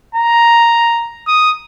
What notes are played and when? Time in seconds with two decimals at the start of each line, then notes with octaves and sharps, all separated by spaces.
0.15 A#5
1.27 D#6